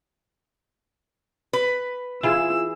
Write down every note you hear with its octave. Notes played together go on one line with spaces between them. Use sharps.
B4
E3 E4 F4 G#4 E6